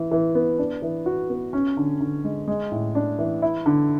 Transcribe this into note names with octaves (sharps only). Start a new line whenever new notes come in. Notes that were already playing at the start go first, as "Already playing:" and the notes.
Already playing: E3
E3
B3
D4
E3
F#4
B3
C#4
D3
D3
G#3
G#3
A2
D4
E3
E4
D3